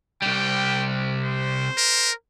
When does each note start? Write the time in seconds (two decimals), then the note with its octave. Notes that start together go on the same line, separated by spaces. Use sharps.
0.22 C2 G3 G5
1.24 C5
1.77 A#4